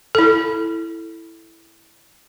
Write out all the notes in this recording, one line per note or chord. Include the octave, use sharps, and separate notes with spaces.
E4 A4